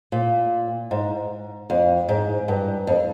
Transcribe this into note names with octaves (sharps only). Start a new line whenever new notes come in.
A#2
G#2
F2
G#2
G2
F2